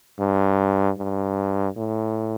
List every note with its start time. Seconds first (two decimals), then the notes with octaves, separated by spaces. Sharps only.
0.19 G2
0.98 G2
1.77 A2